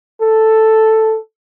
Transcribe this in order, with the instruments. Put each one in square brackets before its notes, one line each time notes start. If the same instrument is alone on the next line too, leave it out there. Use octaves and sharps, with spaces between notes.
[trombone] A4